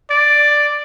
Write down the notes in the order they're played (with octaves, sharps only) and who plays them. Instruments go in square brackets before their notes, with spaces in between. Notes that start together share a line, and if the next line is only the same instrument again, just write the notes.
[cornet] D5